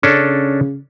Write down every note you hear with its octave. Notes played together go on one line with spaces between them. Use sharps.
C#3 C#4 D4 A4